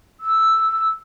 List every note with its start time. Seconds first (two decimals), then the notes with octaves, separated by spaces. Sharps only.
0.21 E6